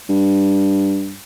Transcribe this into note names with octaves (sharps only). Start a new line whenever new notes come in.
G2